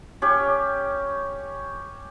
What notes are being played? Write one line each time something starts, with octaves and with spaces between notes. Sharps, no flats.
C#4 G4